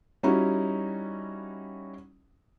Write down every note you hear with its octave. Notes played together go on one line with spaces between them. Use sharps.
G3 C#4 D#4 E4 F#4